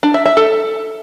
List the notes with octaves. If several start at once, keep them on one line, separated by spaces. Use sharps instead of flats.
D4
E5
E5
A4